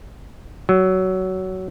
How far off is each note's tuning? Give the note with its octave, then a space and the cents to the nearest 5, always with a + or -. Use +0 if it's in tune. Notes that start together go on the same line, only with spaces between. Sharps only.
F#3 +15